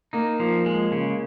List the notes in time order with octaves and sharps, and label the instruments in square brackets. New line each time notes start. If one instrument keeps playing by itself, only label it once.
[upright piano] A#3 [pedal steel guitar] D#4
[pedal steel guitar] F3 [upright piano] A#3
[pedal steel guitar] G#3
C#3